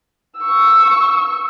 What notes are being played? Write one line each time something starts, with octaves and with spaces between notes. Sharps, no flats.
C#6 E6